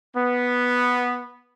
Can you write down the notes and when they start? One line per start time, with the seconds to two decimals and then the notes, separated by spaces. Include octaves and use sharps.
0.16 B3